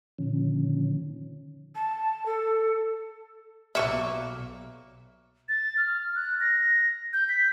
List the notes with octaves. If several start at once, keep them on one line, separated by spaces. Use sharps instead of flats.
A#2 D3 D#3 F3 C#4
A5
A4
B1 A#3 A4 B4 E5 C#6
A6
F6
F#6
A#6
G6
B6